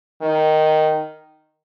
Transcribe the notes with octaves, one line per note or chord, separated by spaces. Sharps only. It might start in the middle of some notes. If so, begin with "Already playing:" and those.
D#3